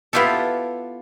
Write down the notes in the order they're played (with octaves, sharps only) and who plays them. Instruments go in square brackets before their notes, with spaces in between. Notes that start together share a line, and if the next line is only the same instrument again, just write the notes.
[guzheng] B3 E4 F4 G4 A4